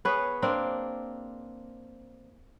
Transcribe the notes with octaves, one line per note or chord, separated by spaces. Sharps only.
B3 G#4 B4 C#5
A#3 C4 D4